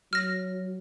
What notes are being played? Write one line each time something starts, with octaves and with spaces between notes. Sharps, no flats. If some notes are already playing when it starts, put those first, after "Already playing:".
F#3 F6 A#6